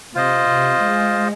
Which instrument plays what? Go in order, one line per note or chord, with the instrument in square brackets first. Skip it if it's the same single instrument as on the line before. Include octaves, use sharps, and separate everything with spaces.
[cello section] C3 [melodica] F4 C5 D#5
[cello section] C3
G#3